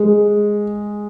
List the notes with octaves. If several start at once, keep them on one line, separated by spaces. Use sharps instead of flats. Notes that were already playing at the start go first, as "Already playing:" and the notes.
Already playing: G#3